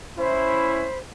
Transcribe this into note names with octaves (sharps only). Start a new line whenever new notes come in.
C#4 E4 C5 B5